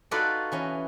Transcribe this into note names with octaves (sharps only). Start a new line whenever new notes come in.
D#4 F4 F#4 A4 B4 D5
E3 C#4 D#5